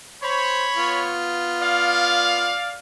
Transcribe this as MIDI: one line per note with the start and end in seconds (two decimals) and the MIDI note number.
0.23 0.65 72
0.23 1.19 73
0.23 1.19 83
0.77 2.54 59
0.77 2.54 65
1.61 2.79 74
1.61 2.79 77